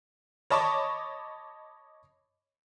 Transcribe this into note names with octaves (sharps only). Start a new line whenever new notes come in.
C#5 D#5 A5 B5 C#6 D6